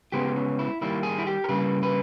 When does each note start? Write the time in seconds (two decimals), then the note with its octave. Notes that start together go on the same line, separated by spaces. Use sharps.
0.12 C#3 G#3 B3 G4
0.36 C#4
0.59 E4
0.81 D#3 G3 A#3 E4
1.03 G#4
1.18 E4
1.27 G4
1.44 A#4
1.49 C#3 G3 A#3 B4
1.83 B4